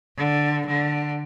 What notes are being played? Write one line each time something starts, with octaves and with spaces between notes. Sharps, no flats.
D3
D3